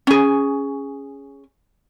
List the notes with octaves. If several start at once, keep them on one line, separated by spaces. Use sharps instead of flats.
C#4 G#4